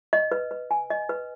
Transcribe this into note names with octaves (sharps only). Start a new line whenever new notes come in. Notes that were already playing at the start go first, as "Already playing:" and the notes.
D#5
B4
B4
G#5
D#5
B4